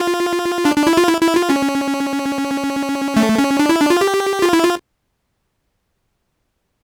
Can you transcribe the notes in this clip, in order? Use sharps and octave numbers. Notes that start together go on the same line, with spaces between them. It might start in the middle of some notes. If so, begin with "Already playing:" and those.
Already playing: F4
D4
D4
E4
F4
E4
E4
F4
C#4
A3
C#4
D4
E4
D4
F4
G4
F4
E4
F4